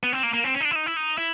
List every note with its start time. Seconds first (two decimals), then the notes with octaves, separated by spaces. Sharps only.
0.03 B3
0.13 C4
0.23 A#3
0.33 A#3
0.44 C4
0.54 C#4
0.60 D#4
0.65 D4
0.71 E4
0.75 D#4
0.86 E4
0.96 D#4
1.18 E4